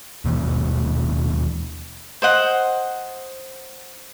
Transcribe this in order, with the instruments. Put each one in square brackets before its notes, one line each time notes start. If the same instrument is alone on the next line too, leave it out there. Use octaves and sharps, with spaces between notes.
[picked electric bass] D#2 B2 E3 A#3
[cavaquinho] C5 D#5 F#5